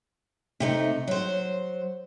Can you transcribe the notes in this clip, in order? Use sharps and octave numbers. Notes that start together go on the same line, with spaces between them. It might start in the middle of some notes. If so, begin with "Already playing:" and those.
C3 A3 D#4
F#3 C5